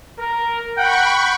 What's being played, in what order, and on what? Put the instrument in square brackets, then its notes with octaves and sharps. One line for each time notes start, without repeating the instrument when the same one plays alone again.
[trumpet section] A#4
[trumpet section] F#5 [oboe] G5 [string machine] B5 C#6